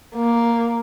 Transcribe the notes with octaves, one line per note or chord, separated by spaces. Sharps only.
A#3